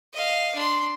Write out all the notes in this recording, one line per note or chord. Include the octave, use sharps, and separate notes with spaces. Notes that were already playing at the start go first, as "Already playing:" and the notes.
D#5 F5
D4 C6